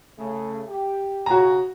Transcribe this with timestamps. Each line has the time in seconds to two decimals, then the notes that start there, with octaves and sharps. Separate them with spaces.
0.18 C#3 A3
0.68 G4
1.26 C#3 F#4 A#5